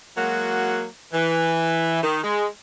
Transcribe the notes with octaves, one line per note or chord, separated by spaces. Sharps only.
F#3 G#3 A#3 F#4
E3
D#3
G#3